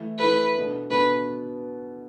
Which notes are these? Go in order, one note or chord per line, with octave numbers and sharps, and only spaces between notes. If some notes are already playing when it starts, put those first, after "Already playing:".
Already playing: E3 A3 E4 A4
E3 A3 E4 A4 B4
B2 B3 D4 A4
B2 B3 D4 A4 B4